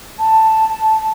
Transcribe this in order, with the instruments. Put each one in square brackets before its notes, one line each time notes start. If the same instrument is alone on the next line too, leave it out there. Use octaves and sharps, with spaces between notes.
[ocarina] A5